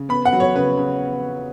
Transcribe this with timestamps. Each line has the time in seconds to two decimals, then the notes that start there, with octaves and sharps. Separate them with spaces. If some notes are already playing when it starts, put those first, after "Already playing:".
Already playing: C#3
0.09 B3 B5
0.25 F#5
0.33 F#3
0.40 C#5
0.55 C#3 B4
0.78 C#3